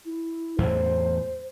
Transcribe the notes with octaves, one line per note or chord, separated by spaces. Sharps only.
E4
E2 A2 F#3 C5